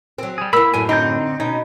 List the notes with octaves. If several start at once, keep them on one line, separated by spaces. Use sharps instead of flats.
F#3 C4
G3 G#4
A#3 E4 B5 E6
F#2 A2 G#5
D3 C4 D#4 G6
B2 C#4 D#4